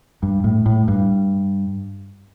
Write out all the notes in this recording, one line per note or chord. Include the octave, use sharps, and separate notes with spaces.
G2
A2
A2
G2